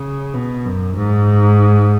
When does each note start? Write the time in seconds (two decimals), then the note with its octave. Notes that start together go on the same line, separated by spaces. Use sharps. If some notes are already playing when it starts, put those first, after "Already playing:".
Already playing: C#3
0.34 B2
0.65 F#2
0.96 G#2